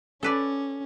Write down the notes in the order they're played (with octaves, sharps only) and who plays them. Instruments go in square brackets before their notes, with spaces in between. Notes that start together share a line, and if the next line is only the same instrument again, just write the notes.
[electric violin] C#4 [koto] A4 B4 D5